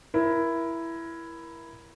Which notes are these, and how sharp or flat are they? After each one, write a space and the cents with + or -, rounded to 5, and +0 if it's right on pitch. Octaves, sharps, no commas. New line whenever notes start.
E4 +10 A#4 +25